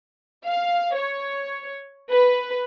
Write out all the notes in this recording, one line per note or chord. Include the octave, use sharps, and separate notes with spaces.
F5
C#5
B4